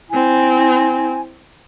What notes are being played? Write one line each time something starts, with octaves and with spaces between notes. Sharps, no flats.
C4 E4 G#5